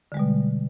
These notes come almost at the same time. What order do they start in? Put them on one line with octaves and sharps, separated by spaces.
D3 G#3 G3 B2